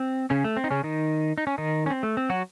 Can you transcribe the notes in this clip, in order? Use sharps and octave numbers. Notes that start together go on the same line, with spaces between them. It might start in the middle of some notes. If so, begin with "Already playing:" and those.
Already playing: C4
C#3 C#4
A3
C4
D#4
C#3 C#4
D#3 D#4
D#4
C#4
D#3 D#4
C#4
C4
A3
C4
F#3 F#4